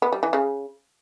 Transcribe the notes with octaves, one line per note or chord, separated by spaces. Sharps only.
B3
G3
E3
C#3